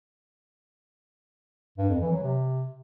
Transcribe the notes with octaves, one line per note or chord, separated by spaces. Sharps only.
G2
F2
E3
F#3
C3